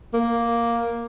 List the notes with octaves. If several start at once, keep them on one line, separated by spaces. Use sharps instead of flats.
A#3